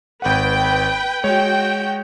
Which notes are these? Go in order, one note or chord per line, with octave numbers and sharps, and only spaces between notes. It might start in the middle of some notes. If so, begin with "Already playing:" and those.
G#1 B4 F#5 G5
G#3 F#4 C#5 G5